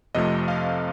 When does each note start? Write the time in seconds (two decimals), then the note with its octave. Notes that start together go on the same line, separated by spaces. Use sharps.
0.15 F2 C3 F3 A3 D#5
0.48 F5